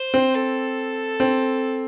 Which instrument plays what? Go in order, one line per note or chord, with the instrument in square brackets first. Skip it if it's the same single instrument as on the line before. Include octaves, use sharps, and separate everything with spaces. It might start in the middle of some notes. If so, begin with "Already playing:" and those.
Already playing: [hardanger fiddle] C5
[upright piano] C4
[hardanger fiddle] A4
[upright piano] C4